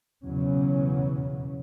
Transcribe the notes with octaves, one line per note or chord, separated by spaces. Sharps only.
B1 E2 C#3 E3 F#3 C#4